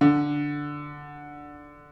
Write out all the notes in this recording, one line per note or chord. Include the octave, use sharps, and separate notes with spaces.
D3